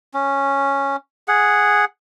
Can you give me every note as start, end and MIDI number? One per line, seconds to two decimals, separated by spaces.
0.14 0.96 61
1.28 1.85 68
1.28 1.85 78